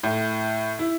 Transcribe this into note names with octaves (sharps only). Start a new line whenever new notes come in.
A2
E4